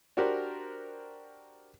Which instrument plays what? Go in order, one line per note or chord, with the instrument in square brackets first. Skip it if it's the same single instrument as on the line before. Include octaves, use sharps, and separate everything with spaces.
[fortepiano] D4 F#4 G4 A#4 C5